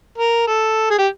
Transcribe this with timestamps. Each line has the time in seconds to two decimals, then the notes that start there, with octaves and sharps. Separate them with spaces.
0.18 A#4
0.47 A4
0.90 G#4
0.98 G4